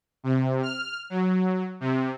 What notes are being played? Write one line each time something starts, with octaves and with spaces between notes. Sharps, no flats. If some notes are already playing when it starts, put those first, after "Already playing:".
C3
F6
F#3
C3